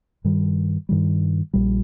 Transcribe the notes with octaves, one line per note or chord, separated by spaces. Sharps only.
G2 D#3 G3
G2 D#3 G3
A#1 A#2 G3